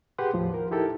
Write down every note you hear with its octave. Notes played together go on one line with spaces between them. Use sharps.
G4 G#4 B4 F#5 C6
D#2 A2 F3
A#4
D#4 E4 G4 A4 A#4